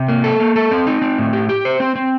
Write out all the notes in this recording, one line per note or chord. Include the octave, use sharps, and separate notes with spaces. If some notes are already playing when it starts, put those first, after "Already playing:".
Already playing: C3
A#3
A4
A#3
A4
C4
D#4
C4
A2
G4
G4
C5
C4
C4